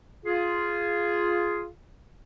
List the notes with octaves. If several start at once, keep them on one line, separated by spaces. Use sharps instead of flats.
F4 G#4